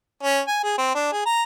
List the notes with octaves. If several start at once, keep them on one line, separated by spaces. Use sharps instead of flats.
C#4
G#5
G#4
C4
D4
G#4
A#5